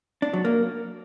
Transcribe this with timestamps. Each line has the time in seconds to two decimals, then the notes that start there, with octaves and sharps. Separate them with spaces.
0.22 D4
0.33 F#3
0.45 A#3